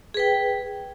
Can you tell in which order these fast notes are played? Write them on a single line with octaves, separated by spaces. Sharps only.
G#4 B4 G5